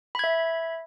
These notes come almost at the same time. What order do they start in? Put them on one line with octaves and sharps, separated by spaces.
B5 G#6 E5